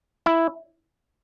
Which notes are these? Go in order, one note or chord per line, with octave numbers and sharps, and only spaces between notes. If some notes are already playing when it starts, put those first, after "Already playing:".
E4